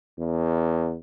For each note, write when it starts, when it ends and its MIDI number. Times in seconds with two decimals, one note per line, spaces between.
0.19 0.96 40